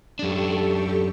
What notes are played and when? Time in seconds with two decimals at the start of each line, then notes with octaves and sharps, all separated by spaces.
0.19 F#2 D4 G4 A4 C#6